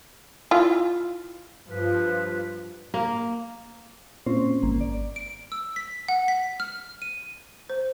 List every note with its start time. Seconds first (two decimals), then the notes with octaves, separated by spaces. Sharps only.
0.51 E4 F4
1.71 G2 F3 B4
2.94 A#3
4.26 A#2 C4 C#4 C5
4.63 G#1 A#3
4.80 D5
5.16 D7
5.52 E6
5.76 B6
6.08 F#5
6.28 B6
6.60 F6
7.02 D#7
7.69 C5